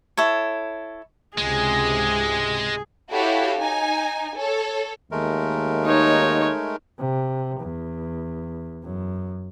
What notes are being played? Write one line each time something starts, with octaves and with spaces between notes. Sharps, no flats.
E4 A4 C#5
C#2 G#2 C3 G#3 G#4
E4 F#4 G4 A4 C#5 F5
D#4 G#5
A4 C#5
D#2 G#3 A3 A#4
D#4 C#5
C3
E2
F#2